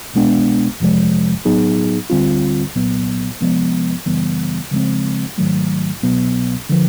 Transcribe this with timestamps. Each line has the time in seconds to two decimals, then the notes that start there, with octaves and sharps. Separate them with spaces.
0.14 C2 B2 G#3 B3 D4
0.80 F2 C3 F3 G#3
1.46 A2 F#3 B3 D#4 G#4
2.10 D2 D3 G3 C4 F4
2.75 C2 A#2 F#3 B3
3.41 D2 C3 F3 G#3 B3
4.06 F#2 C#3 E3 G3 B3
4.72 C#3 F3 G#3 C4
5.38 G#2 D#3 F#3 A3
6.02 C2 B2 F#3 B3
6.69 D3 F3